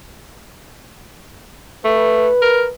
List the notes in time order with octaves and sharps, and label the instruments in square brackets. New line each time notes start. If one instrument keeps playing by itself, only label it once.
[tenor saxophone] A3 [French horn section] B4
[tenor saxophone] A#4